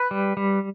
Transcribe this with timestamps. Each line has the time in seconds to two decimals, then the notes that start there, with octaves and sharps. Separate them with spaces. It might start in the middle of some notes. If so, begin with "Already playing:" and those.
Already playing: B4
0.11 G3
0.37 G3